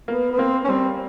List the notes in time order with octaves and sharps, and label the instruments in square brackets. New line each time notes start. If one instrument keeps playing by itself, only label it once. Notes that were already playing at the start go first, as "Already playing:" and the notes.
[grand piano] A#3 [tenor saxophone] B3
[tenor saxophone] B3
[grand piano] A#3 [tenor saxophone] C4
[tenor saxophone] C#4
[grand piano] G3 [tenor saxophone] C4